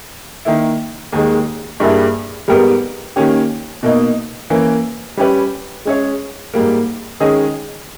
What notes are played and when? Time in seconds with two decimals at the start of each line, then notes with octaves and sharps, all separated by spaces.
0.45 D#3 A#3 E4
1.12 D#2 D#3 G#3
1.80 G2 G3 A#3 E4 G#4
2.48 G#2 G3 B3 G4 A#4
3.16 D#3 A#3 C#4 G4
3.83 B2 A#3 D#4
4.50 E3 A#3 C#4
5.17 G3 C#4 G4 B4
5.85 G#3 C#4 G#4 C#5
6.54 G#2 G3 A#3
7.20 D#3 G#3 C#4 G#4 D#5